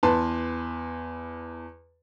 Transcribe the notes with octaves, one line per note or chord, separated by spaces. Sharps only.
E2 B4 A5 C6